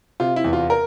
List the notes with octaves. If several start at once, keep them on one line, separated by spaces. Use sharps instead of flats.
C3 F4
E4
E2
F4
A#4